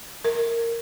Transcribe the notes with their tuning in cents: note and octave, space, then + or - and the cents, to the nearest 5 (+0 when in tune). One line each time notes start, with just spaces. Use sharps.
A#4 -10